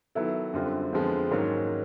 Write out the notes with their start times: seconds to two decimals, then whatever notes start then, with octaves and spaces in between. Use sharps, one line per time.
0.15 D#3 F#3 B3 E4 A4
0.53 F#2 D3 G3 C4 F4
0.93 F2 D3 F3 G#3 B3
1.31 G#2 D#3 F#3 A#3 C#4